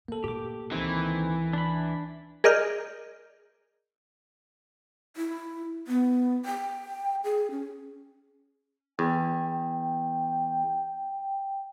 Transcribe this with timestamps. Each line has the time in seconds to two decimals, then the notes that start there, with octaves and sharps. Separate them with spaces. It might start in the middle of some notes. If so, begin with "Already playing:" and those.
0.08 C3 A#3 A4
0.24 D2 A#2 G4 D6
0.71 C#2 C3 D#3 E3 C4 E4
1.53 D4 B5
2.44 G#4 A#4 D5 D#5 F6 G6
5.17 E4
5.87 B3
6.45 G5
7.24 G#4
7.51 C#4
8.99 E2 G5